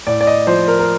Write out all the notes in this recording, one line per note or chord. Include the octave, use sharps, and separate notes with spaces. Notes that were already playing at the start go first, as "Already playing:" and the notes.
A2 D5
D5
D#5
F3 C5
A#4
A#4